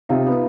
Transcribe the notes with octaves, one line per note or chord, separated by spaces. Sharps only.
C3 D#4 F4
B3